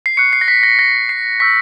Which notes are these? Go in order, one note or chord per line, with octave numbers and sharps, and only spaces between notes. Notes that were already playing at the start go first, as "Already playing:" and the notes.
C7
C#6 F#6 C#7
C7
A#6
B6
A#6
A#6
C7
C#6 E6 G6 B6